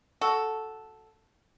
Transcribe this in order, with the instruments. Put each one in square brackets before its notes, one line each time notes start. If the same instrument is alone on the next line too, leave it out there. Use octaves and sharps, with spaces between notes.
[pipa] F#4 A4